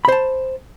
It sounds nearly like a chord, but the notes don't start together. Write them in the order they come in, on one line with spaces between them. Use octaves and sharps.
B5 C5 A5